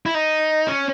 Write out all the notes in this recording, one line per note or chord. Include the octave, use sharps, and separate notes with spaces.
E4
D#4
C#4